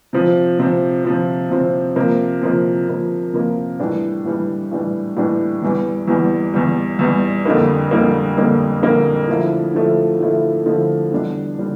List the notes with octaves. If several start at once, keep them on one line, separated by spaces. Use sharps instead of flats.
C3 F3 C4
C3 F3 C4
C3 F3 C4
C3 F3 C4
C3 F3 A#3
C3 F3 A#3
C3 F3 A#3
C3 F3 A#3
A2 E3 G3 D4
A2 E3 G3 D4
A2 E3 G3 D4
A2 E3 G3 D4
E2 E3 G3
E2 E3 G3
E2 E3 G3
E2 E3 G3
F2 D3 G3 A#3
F2 D3 G3 A#3
F2 D3 G3 A#3
F2 D3 G3 A#3
D3 F3 A3 E4
D3 F3 A3 E4
D3 F3 A3 E4
D3 F3 A3 E4
E2 D3 G3 D4
D3 G3 D4